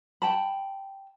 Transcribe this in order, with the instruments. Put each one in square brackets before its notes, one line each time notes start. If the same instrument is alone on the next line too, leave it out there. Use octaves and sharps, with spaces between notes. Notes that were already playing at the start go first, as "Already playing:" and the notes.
[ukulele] G5 A5 B5